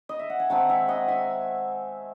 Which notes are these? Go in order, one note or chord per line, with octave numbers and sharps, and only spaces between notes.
D#5
E5
F#5
G#5
D#3 G#3 C4 F#5 A5
E5 G#5
D#5 F#5
E5 G#5